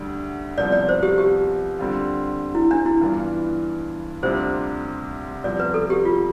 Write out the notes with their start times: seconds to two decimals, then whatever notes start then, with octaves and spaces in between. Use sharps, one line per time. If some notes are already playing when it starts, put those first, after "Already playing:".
Already playing: D2 D3 G3
0.58 C2 C3 F3 B3 D5
0.72 D5
0.89 C5
1.03 G4
1.18 G4
1.79 D3 G3 C4 F4
2.55 E4
2.71 D4
2.86 E4
3.01 G2 E3 B3 D4 F4
4.23 D2 C3 G3 D4 F4 C5
5.44 C2 C3 F3 B3 D5
5.60 B4
5.74 A4
5.90 G4
6.05 F4